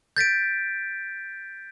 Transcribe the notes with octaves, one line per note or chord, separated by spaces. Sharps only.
G6 A6 B6 D7